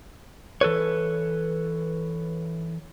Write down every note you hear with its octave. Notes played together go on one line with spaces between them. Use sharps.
E3 A4 B4 C#5